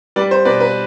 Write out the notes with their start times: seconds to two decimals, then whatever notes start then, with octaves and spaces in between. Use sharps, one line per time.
0.16 G3 B4 D5
0.31 C5
0.45 B2 B4 D5
0.60 B4